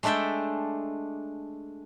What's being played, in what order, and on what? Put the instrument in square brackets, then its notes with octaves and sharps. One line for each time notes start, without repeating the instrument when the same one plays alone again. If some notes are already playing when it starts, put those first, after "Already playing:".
[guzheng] G#3 A3 D4 A4 E5 G5